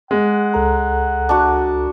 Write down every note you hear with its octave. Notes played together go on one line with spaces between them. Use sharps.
G#3 F#5
C#2 A4 A#5
D4 F#4